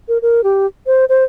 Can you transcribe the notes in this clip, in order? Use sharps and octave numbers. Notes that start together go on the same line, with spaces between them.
A#4
A#4
G4
C5
C5